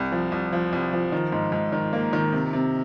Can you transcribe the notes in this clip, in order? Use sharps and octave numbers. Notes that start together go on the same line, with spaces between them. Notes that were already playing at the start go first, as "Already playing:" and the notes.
Already playing: C2
F3
C2
F3
C2
F3
D#3
G#2
G#2
D#3
A#3
D#3
C3
C3